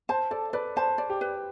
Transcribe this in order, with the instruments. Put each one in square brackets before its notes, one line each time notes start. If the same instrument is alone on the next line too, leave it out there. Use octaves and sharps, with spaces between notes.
[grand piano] C5 [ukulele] A5
[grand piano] A4 [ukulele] D5
[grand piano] B4 [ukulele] D5
[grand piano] C5 [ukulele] A5
[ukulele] D5
[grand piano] G4
[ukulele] B4